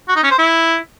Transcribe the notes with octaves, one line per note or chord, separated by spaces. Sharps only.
F#4
D#4
C#4
C5
E4